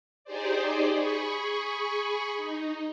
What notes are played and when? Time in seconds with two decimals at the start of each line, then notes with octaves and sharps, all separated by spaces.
0.24 D#4 G4 G#4 C5 D5
0.91 G#4 B5 C#6
2.37 D#4